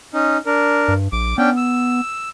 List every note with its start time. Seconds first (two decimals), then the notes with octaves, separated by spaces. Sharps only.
0.14 C#4 D#4
0.46 D4 A#4
0.88 G2
1.12 A#1 D6
1.38 B3 C#4 D4 G5
1.57 E6